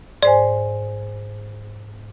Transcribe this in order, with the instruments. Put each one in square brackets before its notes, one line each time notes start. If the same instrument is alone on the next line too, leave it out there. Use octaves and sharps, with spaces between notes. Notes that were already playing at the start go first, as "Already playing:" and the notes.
[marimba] G#2 C5 G#5 [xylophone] D5